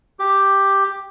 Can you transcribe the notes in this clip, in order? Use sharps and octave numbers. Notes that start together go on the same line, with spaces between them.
G4